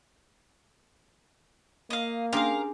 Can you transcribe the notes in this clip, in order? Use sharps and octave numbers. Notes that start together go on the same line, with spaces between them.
A#3 D#5 F5
C#4 D4 G4 G#4 A#4 F5 C6